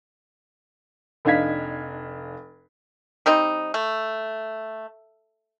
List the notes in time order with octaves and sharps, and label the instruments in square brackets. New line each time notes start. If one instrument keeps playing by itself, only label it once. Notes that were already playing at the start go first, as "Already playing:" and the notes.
[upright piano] F1 D4 D#4 F5 G#6 B6
[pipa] G3 C4 D#4
A3